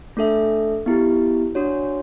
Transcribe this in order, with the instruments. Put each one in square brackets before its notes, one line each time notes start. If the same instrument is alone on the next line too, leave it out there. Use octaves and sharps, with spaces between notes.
[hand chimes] A3 D4 A4 E5
B3 E4 G4
D4 F#4 C#5